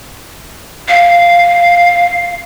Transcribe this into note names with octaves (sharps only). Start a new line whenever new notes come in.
F5